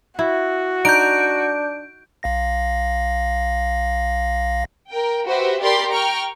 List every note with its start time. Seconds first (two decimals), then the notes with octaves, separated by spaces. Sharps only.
0.19 E4 F#4
0.85 D4 D#4 G6 D7
2.23 B1 F5 A#6
4.90 A#4 G5
5.26 F#4 G4 B4 C5 E5
5.61 G4 A#4 D5 G5 B5 C6
5.90 G5 A#5 C#6 F6